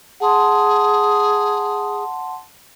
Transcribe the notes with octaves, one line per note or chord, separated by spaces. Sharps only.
G#4 F#5 A5 C6